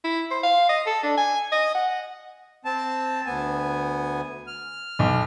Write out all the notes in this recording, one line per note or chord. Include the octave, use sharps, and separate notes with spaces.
E4
C5
F5
D#5
A4
D4
G#5
D#5
F#5
C4 A5
D2 B3 G#5
F6
B1